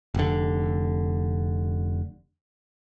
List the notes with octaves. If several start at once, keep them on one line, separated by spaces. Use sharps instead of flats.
F1 D3